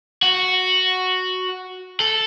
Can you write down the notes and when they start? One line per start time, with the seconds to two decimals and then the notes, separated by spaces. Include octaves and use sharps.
0.23 F#4
2.00 A4